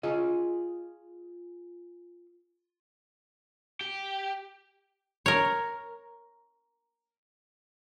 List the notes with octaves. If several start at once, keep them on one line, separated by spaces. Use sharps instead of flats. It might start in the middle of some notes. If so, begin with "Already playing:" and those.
F4 G#4 D#5
G4
A#4 C#5